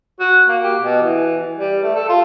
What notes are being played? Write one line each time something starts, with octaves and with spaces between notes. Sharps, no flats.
F#4
A#3
G4
B2
E3
G3
A3
A4
F4